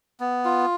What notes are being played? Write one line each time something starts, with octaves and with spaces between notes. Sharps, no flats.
B3
F4